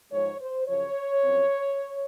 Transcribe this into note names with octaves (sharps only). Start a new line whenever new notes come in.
G#2 F3 G#3 C#5
C5
F#2 C#3 F3 C#5
F#2 F3 C4